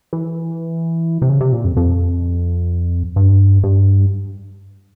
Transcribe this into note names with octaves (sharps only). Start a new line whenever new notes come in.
E3
C3
C#3
C3
A#2
F2
F2
G2
G2